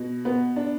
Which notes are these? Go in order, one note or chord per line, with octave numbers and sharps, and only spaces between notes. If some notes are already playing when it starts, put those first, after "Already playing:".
Already playing: B2
B3
D4